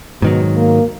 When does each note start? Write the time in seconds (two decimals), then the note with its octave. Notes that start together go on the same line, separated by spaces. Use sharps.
0.22 G#2 B2 D#3 F#3
0.55 A#3